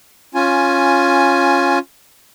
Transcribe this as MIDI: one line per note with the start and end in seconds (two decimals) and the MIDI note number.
0.35 1.79 61
0.35 1.79 65
0.35 1.79 80